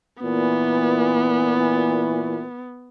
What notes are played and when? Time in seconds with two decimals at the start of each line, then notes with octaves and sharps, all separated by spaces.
0.23 A#2 E3 B3